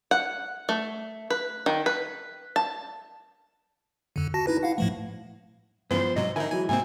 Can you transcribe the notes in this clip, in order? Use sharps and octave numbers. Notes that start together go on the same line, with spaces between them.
F#5
A3
B4
D#3
B4
A5
F2 D3
F#4 A5 A#6
D#4 E4 B4
E4 F5 F#5
A2 F3 A3
C#2 G2 C#3 E3 F3 B3 C5
G#2 C3 F#3 D#5
F2 D3 D#4 E4 A#4 G#5
E3 F#3 G#3 F#4 G#5
G#2 C3 A#3 C4 G#5